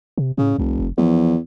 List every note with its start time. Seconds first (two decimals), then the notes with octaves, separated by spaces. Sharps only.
0.18 C3
0.38 A2 C#3
0.58 F1 C2
0.79 F#1
0.98 E2 F3